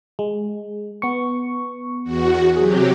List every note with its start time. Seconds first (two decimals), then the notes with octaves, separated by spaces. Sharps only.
0.19 G#3
1.02 B3 C#6
2.04 E2 F#4
2.56 C3 F#3 G4 G#4